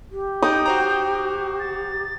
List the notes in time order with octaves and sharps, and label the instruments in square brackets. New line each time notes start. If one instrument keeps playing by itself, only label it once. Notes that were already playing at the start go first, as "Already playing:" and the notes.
[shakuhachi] G4
[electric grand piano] D#4 [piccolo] G5 [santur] D#6
[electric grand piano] F#4 C5 A#5
[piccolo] A6